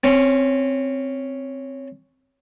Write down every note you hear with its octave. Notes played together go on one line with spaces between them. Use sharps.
C4 C#4